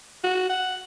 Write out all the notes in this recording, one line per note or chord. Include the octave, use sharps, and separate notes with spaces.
F#4
F#5